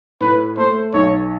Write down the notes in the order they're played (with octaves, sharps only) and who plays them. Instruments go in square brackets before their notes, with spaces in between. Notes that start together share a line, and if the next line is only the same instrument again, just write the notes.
[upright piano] A2 [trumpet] B4
[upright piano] A3 [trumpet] C5
[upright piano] B1 [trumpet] C#5